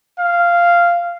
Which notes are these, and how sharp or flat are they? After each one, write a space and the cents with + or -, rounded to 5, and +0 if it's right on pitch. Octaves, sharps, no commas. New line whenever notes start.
F5 -10